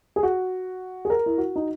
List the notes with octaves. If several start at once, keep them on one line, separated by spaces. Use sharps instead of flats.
G#4
F#4
G#4
A#4
E4
F#4
D#4